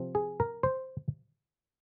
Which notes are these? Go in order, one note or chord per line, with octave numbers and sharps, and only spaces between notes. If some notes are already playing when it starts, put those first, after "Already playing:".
Already playing: C3 F3 C4
G#4
A#4
C5